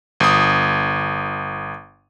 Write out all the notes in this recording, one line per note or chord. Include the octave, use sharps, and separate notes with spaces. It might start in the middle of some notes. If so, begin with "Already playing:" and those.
G1 D#6